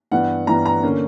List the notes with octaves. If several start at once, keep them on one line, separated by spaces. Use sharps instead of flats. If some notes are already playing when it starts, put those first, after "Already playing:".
G2 E3 G3 B3 F#5
G2 E3 G3 B3 A#5
A#5
D3 A#3 C#4